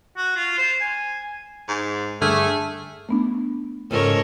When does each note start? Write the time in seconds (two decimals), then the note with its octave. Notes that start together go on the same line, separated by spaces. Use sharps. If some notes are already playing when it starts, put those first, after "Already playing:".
0.17 F#4
0.36 F4
0.58 C5
0.81 G#5
1.68 G#2
2.22 G2 D3 A3 G#4 F6
3.09 A3 B3 D4
3.91 G#2 C#3 F3 A4 A#4 C#5